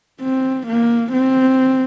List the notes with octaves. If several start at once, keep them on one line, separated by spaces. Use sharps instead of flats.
C4
A#3
C4